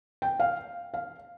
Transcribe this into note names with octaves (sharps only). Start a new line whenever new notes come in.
G5
F5
F5